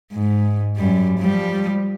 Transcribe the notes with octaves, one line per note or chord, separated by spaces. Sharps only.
G#2
F#2 G3
F3 G3